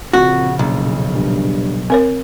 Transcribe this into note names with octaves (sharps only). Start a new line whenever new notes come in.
A#1 F2 C#3 F#4
F#1 B1
G2
C4 A#4 C#5